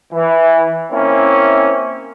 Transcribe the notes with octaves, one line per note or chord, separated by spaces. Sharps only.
E3
A#3 C4 C#4 E4